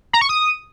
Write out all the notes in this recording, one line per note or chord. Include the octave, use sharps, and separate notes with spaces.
A#5
C#6
D#6